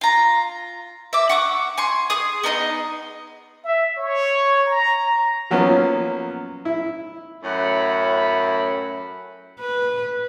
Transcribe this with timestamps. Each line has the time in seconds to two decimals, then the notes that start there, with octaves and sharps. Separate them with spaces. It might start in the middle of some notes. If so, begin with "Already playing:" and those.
0.01 F4 A#5
1.13 E5 D6
1.29 F#5 C#6 D6
1.78 G#5 C6 C#6
2.10 G#4 D#6
2.43 B3 D#4 A#4 D#5
3.64 E5
3.97 C#5
4.66 A#5
5.51 F3 F#3 A#3 B3 C#4 F4
6.65 E4
7.43 F#2 A2 C#5 E5 F#5 B5
9.60 B4